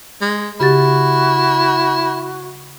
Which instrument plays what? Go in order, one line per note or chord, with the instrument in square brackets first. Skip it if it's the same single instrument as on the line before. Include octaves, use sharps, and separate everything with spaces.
[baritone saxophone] G#3
[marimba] C#3 G4 A6 [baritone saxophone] E4 [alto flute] F#4